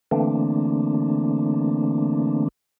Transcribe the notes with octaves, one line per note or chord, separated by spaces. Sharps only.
D3 E3 A3 A#3 C4 D4